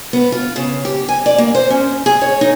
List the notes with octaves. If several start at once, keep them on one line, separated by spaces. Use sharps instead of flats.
B3
F4
C#3
G4
G#5
D5
A#3
C5
C#4
G#4
C#5
D#4